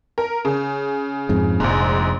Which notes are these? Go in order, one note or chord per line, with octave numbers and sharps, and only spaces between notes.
A#4
C#3
F2 G#2
F1 A#1 G#2